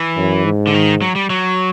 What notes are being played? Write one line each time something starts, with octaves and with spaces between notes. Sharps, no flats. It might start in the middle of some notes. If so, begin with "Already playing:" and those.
Already playing: E3
F#2
G#2
D3
D#3
F#3
G3
F#3